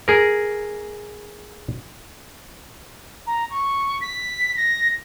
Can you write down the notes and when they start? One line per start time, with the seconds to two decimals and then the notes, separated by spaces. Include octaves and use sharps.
0.08 G#4 A#4
3.27 A#5
3.51 C#6
4.01 B6
4.57 A#6